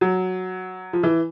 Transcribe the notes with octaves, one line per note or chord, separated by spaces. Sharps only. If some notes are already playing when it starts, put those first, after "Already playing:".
F#3
F3
E3